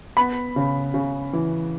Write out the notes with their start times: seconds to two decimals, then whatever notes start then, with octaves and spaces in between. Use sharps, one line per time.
0.17 B3 B5
0.56 C#3
0.94 C#3
1.33 E3